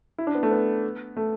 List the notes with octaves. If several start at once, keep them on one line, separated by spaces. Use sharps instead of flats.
E4
D4
B3
A3
B3
A3